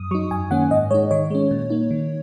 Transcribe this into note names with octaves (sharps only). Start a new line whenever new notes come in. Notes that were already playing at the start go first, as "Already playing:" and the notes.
Already playing: F#2 D#6
F#3 D#4 C#6
F#2 G#5
D#3 A#3 C#4 F#5
G#2 D#5
G#3 D#4 C#5
D#3 C#5
G#3 C#4
A#2
A#3 D#4
D#3